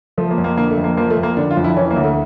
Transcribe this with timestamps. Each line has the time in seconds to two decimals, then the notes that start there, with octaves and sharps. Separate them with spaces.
0.18 F3 A3
0.31 A#3
0.38 F2
0.44 A#3
0.57 D3 A#3
0.71 A3
0.78 F2
0.84 A#3
0.97 F3 A#3
1.10 A3
1.17 F2
1.23 A#3
1.37 D3 D4
1.51 F4
1.57 F2
1.64 E4
1.77 E3 C#4
1.91 A#3
1.96 D2
2.03 A3